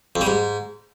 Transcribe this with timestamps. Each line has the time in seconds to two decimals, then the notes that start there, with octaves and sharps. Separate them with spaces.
0.16 F2
0.21 G3
0.27 G#2